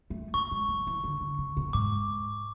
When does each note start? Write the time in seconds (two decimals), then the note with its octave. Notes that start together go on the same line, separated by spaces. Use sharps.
0.10 A3
0.34 C#4 C#6
0.51 G#3
0.68 F#3
0.87 E3
1.04 D3
1.21 D3
1.38 C#3
1.57 B2
1.73 G#2 D6